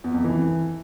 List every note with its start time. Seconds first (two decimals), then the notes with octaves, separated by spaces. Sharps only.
0.04 E2
0.14 F2
0.24 E3